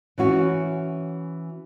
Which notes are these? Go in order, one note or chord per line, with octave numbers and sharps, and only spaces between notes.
E3 C#4 F#4